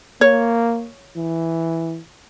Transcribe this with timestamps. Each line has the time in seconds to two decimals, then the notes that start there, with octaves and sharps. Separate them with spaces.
0.21 A#3 C#5
1.17 E3